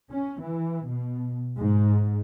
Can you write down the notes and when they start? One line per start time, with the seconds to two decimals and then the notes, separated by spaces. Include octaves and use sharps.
0.11 C#4
0.41 E3
0.87 B2
1.59 G#2